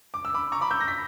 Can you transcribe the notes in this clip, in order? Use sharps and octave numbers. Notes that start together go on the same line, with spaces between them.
D6
E6
B5 D6
A#5 C#6
B5 D6
E6 G6
A#6
B6